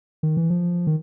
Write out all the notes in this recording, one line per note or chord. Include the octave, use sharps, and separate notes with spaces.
D#3
E3
F3
D#3